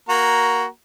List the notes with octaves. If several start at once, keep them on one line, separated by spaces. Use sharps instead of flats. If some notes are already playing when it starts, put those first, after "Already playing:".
A#3 F#4 A#5